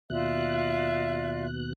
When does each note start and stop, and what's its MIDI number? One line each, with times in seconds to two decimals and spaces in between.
0.10 1.73 39
0.10 1.73 47
0.10 1.45 65
0.10 1.45 74
0.10 1.45 76
0.10 1.73 90